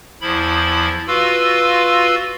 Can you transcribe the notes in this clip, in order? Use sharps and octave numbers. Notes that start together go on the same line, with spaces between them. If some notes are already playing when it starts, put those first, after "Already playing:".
E2 F3 E4 B5
F4 F#4 B4 F5 C6 E6